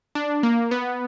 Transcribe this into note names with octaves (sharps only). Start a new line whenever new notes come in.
D4
A#3
B3